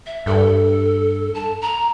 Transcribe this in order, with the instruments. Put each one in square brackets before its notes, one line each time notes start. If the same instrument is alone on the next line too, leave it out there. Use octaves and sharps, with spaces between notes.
[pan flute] E5
[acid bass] G2 [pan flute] A4
[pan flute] A5
A#5